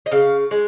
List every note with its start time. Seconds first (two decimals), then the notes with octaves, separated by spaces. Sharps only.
0.06 D#5
0.12 C#3 F5
0.51 G#3